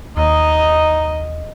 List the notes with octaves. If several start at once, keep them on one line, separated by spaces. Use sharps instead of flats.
D#2 D#4 D#5